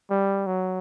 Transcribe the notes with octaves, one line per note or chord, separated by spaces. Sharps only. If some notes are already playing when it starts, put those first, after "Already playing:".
G3
F#3